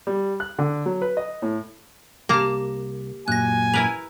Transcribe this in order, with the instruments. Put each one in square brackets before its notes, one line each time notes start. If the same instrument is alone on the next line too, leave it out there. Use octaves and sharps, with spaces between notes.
[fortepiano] G3
F#6
D3
F#3
B4
D#5
A2
[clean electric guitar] C2 [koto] A#3 A5 A#5 [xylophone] G4 A#6
[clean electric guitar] F#2 A#2 [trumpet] G#5 [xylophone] F#6 A#6
[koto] E4 A#4 B4 [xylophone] F7